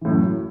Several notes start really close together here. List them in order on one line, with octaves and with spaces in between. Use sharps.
E3 A2 F#2